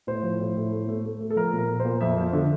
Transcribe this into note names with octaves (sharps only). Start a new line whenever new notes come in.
A2 C5
F3
A2
A2
A3
A3
A3
A3
A4
F3 A#4
A#2
A#4
A#2
C5
A#2
F2 E5
F3
D3